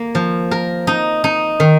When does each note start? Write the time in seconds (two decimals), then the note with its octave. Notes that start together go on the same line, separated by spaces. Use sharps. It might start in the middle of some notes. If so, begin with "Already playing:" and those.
Already playing: A#3
0.15 F3
0.51 A#4
0.87 D#4
1.24 D#4
1.60 D#3